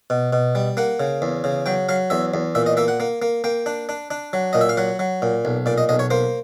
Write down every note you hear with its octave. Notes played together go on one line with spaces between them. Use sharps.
B2
B2
G3
A#3 F#5
C#3
E2
C#3
F#3 G5
F#3 F5
E2 E5
E2
A#2 E5
D#5
A#3 E5
F#5
A#3
A#3
A#3 G5
D4
D4
D4
F#3
A#2 D#5
E5
F5
F#3 F#5
F#3
A#2
B1
A#2 D5
D#5
B1 D#5
C#5
A#3 C5